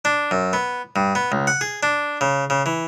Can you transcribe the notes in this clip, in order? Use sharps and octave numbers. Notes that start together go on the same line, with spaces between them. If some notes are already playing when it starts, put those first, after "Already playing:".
D4
F#2
B3
G2
B3
C#2
F#5
G#4
D4
C#3
C#3
E3